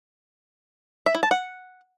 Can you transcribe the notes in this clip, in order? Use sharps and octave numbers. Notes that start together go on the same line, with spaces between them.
E5
E4
A5
F#5